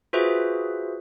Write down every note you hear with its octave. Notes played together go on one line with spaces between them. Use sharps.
F4 F#4 G#4 B4 C5 E5